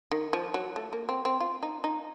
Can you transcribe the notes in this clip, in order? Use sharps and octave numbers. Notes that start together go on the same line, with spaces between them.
D#3
F3
F#3
A3
A#3
C4
C4
F4
D#4
D#4